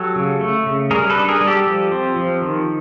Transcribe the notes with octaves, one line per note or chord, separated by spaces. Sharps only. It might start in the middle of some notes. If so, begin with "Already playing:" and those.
Already playing: F#3 G4 A4
C#3
A3
C#3
G3 G#4 A#4
A4 B4
D4
G#4 A#4
G3
G4 A4
F3
C4
F3
D#3